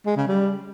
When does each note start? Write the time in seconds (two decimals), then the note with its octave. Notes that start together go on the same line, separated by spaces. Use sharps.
0.06 G#3
0.17 C#3
0.28 G3